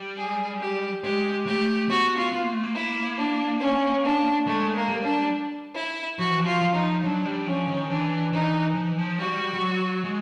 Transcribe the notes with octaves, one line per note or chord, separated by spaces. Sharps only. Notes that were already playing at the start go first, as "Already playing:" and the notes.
Already playing: G3
G#4
G4
G#3 G4
A3 G4
B3 F#4
F4
B3
A#3
A3
A#3
E4
D4
C#4
D4
G#3 A3
A#3
G3
D4
E4
F3 F#4
E3
F3
F4
F3
D#4
F#3 D4
G3
F3 C#4
D#3
E3 D4
E3 D#4
F3
E3
F3
G3 F#4
G3
F#3
G#3